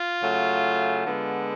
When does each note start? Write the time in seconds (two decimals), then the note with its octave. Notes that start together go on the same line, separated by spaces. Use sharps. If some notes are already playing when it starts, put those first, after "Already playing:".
Already playing: F4
0.22 C#3 F#3 A3
1.07 D3 G#3 B3